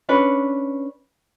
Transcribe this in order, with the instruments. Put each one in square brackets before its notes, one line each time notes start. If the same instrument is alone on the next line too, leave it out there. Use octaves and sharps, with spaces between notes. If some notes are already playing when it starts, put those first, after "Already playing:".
[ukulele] C#4 D4 B4